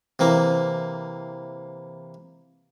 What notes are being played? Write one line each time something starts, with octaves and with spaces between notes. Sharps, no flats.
C3 E3 A#3